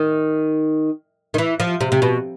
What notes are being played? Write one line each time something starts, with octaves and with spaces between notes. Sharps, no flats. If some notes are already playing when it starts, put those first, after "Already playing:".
Already playing: D#3
D#3
E3
F3
C3
C3
B2